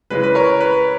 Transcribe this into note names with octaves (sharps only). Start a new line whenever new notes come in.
C#3 E3 G#3 B4
B4
A#4 C#5
B4